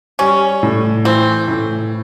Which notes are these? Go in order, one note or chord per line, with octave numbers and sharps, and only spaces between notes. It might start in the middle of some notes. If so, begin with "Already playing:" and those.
G3 C#4
A2
E3 C4
A2